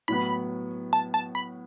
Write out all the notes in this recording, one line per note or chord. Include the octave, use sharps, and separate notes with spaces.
A2 F#3 B3 B5
A5
A5
B5